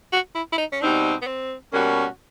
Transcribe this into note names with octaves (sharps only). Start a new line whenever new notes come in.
F#4
E4
E4
D#4
C#4
B2 G3 C4 D4 D#4
B3
C4
B2 G3 A#3 C#4 F#4